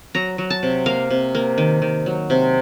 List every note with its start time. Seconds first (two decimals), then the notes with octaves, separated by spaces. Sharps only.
0.15 F#3 A#5
0.38 F#3
0.50 A5
0.63 C3
0.86 A#3 F5
1.11 C3
1.35 A#3
1.58 D#3
1.82 D#3
2.06 F#3
2.30 C3